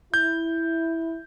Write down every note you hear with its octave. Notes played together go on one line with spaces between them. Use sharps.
E4 G6